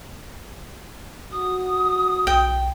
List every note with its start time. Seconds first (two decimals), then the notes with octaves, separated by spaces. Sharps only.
1.32 F#4 D#6
2.27 B1 G5